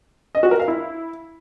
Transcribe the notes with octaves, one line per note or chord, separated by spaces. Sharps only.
D#5
F#4
A#4
F5
E4